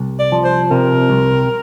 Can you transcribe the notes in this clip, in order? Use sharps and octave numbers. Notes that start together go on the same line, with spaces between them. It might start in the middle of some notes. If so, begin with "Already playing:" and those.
Already playing: C2
D5
F3
C5
C3 A#4
C2